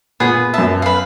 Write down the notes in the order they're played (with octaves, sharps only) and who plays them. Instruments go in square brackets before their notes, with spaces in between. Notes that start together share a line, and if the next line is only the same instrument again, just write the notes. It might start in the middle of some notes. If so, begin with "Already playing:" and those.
[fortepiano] A#2 [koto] B3 [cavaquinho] G#4
[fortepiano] F#2 E5 [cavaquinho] A5
[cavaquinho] B4 F5